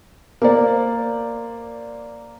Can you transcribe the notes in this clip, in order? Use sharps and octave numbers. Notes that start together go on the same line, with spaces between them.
A#3 C5 D5